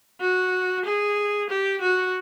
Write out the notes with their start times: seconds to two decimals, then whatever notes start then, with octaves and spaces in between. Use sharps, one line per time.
0.21 F#4
0.85 G#4
1.50 G4
1.81 F#4